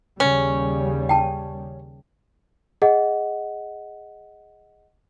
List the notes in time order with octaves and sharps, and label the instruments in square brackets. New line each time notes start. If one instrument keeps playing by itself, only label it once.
[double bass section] D#2 C#3 G3 [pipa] C#4
[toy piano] G5 A5
[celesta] G#4 D#5 F#5